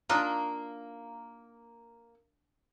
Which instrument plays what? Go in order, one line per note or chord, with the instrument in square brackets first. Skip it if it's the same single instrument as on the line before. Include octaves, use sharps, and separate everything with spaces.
[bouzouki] A#3 [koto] D4 D#4 F4